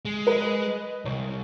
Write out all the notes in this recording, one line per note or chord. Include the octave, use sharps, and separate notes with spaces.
G#3
B4 D#5
C2 C#5